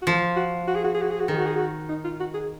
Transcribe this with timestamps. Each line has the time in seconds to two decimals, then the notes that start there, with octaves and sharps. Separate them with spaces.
0.02 F#4
0.07 F3 F4
0.36 F#4
0.68 F#4
0.76 G#4
0.84 F#4
0.94 G#4
1.02 F#4
1.11 G#4
1.20 F#4
1.28 D#3 G#4
1.38 F#4
1.47 G#4
1.55 F#4
1.89 D#4
2.04 F4
2.20 F#4
2.34 G#4